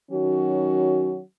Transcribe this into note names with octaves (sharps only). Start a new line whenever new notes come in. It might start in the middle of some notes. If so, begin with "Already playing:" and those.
D#3 F#3 C#4 F#4